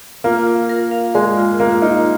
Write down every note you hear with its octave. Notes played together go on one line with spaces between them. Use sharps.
A#3 F4
F4
A#4
F5
G#3 A#4
F4
A#3 F4
D#4 F4